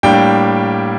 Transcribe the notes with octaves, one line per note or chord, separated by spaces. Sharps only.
A2 G3 A#3 D4 G5